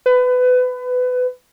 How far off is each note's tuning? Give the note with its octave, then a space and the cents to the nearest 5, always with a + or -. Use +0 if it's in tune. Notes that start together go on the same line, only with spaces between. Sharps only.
B4 +25